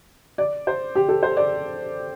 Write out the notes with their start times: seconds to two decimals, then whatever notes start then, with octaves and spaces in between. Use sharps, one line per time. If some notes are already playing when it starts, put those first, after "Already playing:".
0.38 D5
0.67 C5
0.95 G4
1.09 A4
1.23 C5
1.37 D5